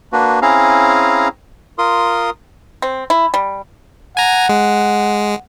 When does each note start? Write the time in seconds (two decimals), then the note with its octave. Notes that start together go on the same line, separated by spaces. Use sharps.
0.13 A#3 D4 F#4 B4
0.42 C4 C#4 E4 G#4 F5 A#5
1.78 F4 A#4 C6 D#6
2.82 C4
3.10 E4
3.34 G3
4.17 F#5 G#5 A#5
4.49 G#3